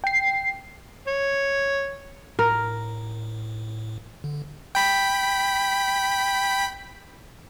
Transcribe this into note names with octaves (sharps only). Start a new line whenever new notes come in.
G5 C7
C#5
A2 A#4
D3
G5 B5 B6